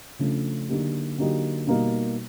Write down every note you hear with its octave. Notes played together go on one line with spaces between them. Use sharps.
C#3 F3 A3 D4
D3 F#3 A#3 D#4 G4
D3 F#3 A#3 D#4 G4
B2 G3 A#3 D#4